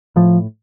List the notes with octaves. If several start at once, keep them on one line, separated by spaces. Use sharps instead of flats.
A2 F3